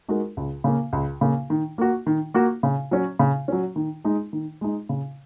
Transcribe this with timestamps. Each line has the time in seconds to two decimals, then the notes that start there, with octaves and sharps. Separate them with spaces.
0.09 G#3 D#4 F#4 A#4
0.37 C#2
0.64 C#3 A#3
0.93 C#2
1.21 C#3 A#3
1.50 D#3
1.78 A#3 F#4
2.07 D#3
2.34 A#3 F#4
2.63 C#3
2.91 F#3 C#4
3.19 C#3
3.48 F#3 C#4
3.76 D#3
4.05 G#3 D#4
4.33 D#3
4.61 G#3 D#4
4.89 C#3